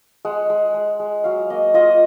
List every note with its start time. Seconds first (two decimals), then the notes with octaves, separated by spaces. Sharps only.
0.25 G#3 F#5
0.50 G#3
0.74 G#3
1.00 G#3
1.24 F#3 F5
1.50 A#3 D#5
1.74 F4 D#5